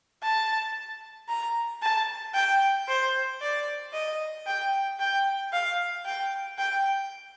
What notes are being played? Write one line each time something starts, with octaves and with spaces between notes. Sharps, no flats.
A5
A#5
A5
G5
C5
D5
D#5
G5
G5
F5
G5
G5